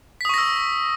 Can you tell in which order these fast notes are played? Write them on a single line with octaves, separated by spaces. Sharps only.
B6 D#6 C#6 A#6 E6